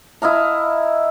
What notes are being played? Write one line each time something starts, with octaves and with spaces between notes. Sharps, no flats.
E4 D#5 F5 A#5